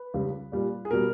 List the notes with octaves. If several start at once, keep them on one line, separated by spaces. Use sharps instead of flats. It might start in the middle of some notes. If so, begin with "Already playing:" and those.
Already playing: B4
C#2 C#3 G3
A#2 G3
G#4
B2 G3 A#4